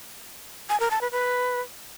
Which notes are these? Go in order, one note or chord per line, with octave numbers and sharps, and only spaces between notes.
G#5
A#4
A5
B4
B4